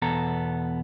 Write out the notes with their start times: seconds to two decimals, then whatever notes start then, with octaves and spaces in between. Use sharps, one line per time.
0.02 E2 B2 B3 A4 A#5